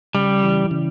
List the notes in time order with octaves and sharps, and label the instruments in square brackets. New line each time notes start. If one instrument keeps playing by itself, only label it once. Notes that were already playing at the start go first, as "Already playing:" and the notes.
[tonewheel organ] C#3 [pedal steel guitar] G3
[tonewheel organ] E3
C#3